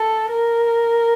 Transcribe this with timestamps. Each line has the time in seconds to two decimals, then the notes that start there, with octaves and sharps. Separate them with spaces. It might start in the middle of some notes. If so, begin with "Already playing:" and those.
Already playing: A4
0.31 A#4